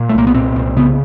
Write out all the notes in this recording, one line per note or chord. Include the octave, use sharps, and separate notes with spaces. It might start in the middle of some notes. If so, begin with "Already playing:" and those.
Already playing: A#2
A3
C2 A#3
B3
A#2 C4
C2
C#3 B3